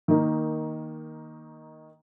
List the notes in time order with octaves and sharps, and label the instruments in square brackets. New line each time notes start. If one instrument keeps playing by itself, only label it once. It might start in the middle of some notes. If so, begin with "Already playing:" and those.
[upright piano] D#3 A#3 D#4